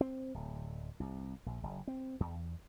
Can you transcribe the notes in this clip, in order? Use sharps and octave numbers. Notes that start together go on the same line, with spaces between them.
C4
D1
C2
A#1
F#1
C4
E2